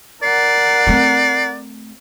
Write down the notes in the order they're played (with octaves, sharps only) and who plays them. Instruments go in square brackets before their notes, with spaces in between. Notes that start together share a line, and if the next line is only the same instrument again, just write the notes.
[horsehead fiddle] A#4 F#5 [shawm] D5 [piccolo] C7
[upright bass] A3 C4